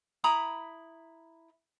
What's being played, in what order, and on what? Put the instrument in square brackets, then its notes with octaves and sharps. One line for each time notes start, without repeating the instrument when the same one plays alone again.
[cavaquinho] E4 A#5 B5 D#6